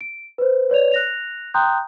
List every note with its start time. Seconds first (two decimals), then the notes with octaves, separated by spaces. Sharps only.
0.01 D7
0.38 B4 C5
0.70 B4 C#5 D5 F7
0.92 F#6 A#6 F7
1.54 G5 A#5 C6 D#6 F#6 G6